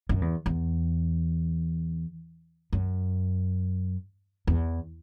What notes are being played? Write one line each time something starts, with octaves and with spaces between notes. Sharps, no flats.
F#2
E2
E2
F#2
E2